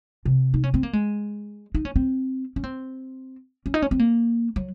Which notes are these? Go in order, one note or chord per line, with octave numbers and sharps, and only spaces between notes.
C3
D#4
C#4
C4
A#3
G#3
D#4
C#4
C4
C#4
C4
C#4
D#4
C#4
C4
A#3
F#3